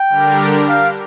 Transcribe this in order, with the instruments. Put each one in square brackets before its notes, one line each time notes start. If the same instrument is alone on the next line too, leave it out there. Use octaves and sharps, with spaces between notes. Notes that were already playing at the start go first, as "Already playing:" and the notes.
Already playing: [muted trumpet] G5
[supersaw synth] D3 G3 D4 G4 A#4
[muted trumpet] F5